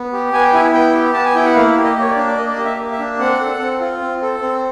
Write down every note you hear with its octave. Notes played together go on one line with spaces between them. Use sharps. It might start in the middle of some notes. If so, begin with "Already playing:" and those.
Already playing: B3
G4
B3 G#5
G5
E4 G#5
B3 G5
G4
B3 A5
G#5
E4 G5
F#5
A#3 F5
G4
D#5
A#3 C#5
D5
D4
D5
A#3 D#5
D5
G4 D#5
E5
A#3
E5
D4
C4 F#5
A4
C4
F4
C4
A4
C4